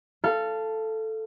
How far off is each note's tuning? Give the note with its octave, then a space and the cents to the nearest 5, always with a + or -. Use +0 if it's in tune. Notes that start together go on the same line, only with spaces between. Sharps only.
A4 +0 F5 -25